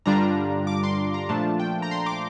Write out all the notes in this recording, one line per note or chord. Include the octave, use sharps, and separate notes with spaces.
G2 D3 G3 D4 F4 A#5
D6
C6
A#5
A#2 F3 A3 D4 F4 A5
G5
A#5
C6
D6